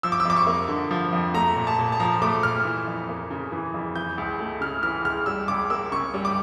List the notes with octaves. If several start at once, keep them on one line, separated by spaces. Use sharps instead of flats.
F3 E6
D6
E6
F2 D6
C#6
A#3
D3
F3
F2
A3 A#5
A#2
A5
A#2
A5
F3 A#5
A3 D6
A#2 F6
E3
F2
A#3
C#3
E3
F2
E3 G6
C#2
A3
C#3 F6
E3 F6
C#2 F6
G3 E6
C#2 D6
A#3 E6
C#3 C#6
G3
D6